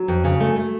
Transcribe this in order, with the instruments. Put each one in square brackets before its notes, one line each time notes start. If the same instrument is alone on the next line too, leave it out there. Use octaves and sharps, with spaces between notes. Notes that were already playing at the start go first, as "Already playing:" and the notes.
Already playing: [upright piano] F#3
[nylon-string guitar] F2
C#3
A3
A3